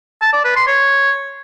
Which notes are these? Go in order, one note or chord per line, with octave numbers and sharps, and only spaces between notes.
A5
D5
B4
C6
C#5